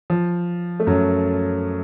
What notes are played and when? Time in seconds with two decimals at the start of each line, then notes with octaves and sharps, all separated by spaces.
0.10 F3
0.80 A3
0.87 F#2 F#3